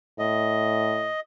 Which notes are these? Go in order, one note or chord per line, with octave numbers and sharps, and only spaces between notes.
A2 D#5